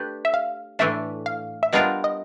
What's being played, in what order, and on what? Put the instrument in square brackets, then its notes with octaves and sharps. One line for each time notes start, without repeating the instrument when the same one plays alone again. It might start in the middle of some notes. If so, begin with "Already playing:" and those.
Already playing: [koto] A3 D4 G4 B4
[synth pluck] E5
F5
[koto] A2 E3 A3 D4 [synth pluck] E5
[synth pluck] F5
E5
[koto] G3 B3 D4 F4 A#4 [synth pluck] D#5
[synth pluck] D#5